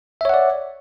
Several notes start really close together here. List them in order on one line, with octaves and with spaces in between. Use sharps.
E5 C#5 F#5 D5